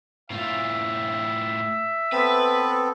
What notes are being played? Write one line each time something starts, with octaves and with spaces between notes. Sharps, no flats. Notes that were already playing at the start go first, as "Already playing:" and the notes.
A2 F4 E5
B3 C4 A4 B4